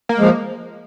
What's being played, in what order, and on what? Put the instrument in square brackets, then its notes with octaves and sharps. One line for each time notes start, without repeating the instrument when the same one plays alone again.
[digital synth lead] A#3
[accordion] F3 G#3